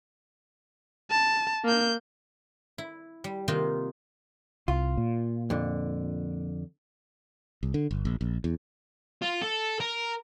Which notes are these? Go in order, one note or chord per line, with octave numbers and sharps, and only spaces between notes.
A5
A#3 G6
E4
G3
C3 D#3 A#3 D#4 F4 D#5
C2 F4
A#2
F2 D3
C2
D3
G1
A#1
A#1
E2
F4
A4
A#4